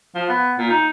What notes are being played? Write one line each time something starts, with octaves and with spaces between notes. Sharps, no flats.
F3
B3
A#2
D#4